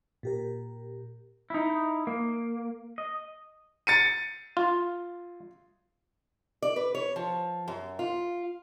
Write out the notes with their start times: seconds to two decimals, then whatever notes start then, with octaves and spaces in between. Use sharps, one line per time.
0.23 A#2 G4 A#4
1.50 D#4 E4
2.07 A#3
2.98 D#5
3.87 A6 C#7 D#7
4.57 F4
6.62 D5
6.76 B4
6.95 C#5
7.16 F3
7.68 F#2
7.99 F4